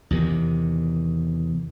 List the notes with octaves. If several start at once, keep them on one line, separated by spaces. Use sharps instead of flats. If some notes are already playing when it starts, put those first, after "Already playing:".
E2 C3 D#3